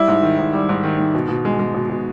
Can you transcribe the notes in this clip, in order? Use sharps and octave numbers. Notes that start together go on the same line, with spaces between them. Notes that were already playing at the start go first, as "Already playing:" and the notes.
Already playing: G3 E4
G#2
D#3
G#2
G3
G#2
D#3
G#2
B2
B2
G#3
G#3
B2
B2